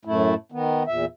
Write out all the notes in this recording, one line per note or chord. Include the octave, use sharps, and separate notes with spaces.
F#2 A2 A3 E4
D#3 B3
E2 A#2 E5